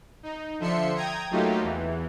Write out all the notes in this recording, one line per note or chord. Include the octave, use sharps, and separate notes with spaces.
D#4
D3 F3 E5 C6 C#7
G5 A#5 D#6 G#6
F#3 A3 A#3 D#4 F4 G4
E2 E3